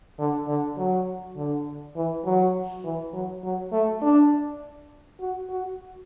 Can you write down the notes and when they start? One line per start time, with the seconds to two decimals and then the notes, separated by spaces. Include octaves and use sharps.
0.19 D3
0.48 D3
0.77 F#3
1.36 D3
1.96 E3
2.25 F#3
2.84 E3
3.13 F#3
3.44 F#3
3.72 A3
4.02 D4
5.20 F#4
5.49 F#4